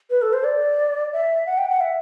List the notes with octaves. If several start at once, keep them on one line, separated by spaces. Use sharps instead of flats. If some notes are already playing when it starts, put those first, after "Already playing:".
B4
A4
C5
D5
E5
F#5
G5
F#5
E5